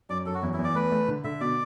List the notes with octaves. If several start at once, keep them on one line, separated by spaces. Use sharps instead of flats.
F#2 D5
F#2 A4
F#4
E2 E4
E4
E2
D5
A3 B4
A3
D3
D3 E5
B2 D5